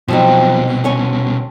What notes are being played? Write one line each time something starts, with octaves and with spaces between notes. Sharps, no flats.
C2 B2 F3 F#3 C4 D#4
C#4 C#5 G#5 A5